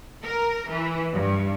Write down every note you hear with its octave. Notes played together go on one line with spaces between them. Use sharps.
A#4
E3
G2